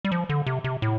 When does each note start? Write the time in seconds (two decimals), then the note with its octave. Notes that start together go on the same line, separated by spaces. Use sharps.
0.05 G3
0.12 F3
0.29 D3
0.46 C3
0.64 C3
0.82 A2